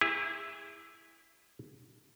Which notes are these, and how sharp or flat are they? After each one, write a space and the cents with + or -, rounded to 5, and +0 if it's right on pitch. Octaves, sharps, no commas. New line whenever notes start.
E4 +0 G#4 -35